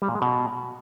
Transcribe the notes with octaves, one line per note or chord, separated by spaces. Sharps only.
G3
A#2
G#3
B2